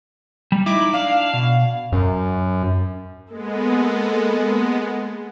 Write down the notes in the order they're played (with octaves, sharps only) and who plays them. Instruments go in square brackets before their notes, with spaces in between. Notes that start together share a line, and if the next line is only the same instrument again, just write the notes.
[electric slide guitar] G3
[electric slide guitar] D#4 E4 [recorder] D6
[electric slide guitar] D4 [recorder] F5
[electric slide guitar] B2
[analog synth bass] F#2
[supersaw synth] G#3 B3 [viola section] A#3 A4